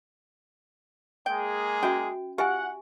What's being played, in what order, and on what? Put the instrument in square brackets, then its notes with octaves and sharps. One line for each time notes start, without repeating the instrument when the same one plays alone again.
[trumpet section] G#3 A#3 G#4 [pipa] G5
[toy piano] C#4 F#4 E5 [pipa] G5
[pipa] F4 [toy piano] G4 E5 G#5 [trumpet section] F#5